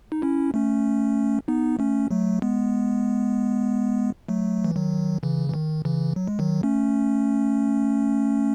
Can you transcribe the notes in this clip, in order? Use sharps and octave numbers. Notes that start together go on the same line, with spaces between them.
D#4
C#4 E4
A3 C#4
B3 D#4
A3 C#4
F#3 A3
G#3 B3
F#3 A3
E3
D#3 F#3
C#3 E3
E3
D#3
C#3 E3
F#3
G#3
D#3 F#3
A3 C#4